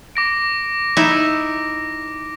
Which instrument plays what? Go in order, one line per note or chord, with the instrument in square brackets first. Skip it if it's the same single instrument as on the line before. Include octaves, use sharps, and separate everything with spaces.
[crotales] D6 A#6 D7
[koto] D#4 E4